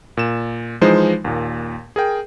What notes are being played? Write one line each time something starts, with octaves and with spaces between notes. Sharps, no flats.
A#2 E7
E3 F3 G#3 D#4 C5
D#2 A#2
G#4 A#4 G5